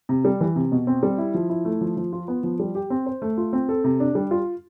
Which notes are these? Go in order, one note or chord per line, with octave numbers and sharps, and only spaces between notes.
C3
G3
E3
C3
B2
C4
G3
E4
F3
E4
A3
F3
F3
F4
B3
F3
G3
G4
C4
C5
A3
F4
C4
A4
C3
D4
G3
F4